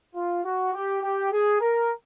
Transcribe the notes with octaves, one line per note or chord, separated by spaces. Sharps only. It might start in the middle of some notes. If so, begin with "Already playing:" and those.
F4
F#4
G4
G4
G#4
A#4